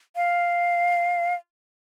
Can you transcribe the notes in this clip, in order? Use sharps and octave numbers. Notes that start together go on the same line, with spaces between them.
F5